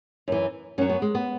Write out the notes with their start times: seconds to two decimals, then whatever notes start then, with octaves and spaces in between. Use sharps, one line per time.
0.28 F#2 E3
0.78 F#2 F#3 C#4
0.90 B3
1.02 G#3
1.15 B3